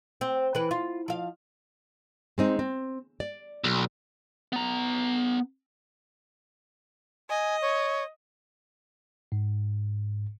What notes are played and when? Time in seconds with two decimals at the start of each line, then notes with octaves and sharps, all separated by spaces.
0.21 C4
0.55 E3 B4
0.71 F4
1.08 F3 F5
2.38 G#3 C4 D#4
2.59 C4
3.20 D5
3.64 B1
4.53 B3 A#5
7.30 D#5 G#5
7.62 C#5
9.32 G#2